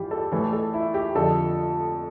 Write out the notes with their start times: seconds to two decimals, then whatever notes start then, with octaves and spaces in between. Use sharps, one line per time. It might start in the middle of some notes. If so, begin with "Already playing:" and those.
Already playing: G2 E3 F4 G4
0.11 A4
0.31 A2 E3 A4
0.53 A4
0.74 E4
0.94 G4
1.15 F2 D3 F3 A4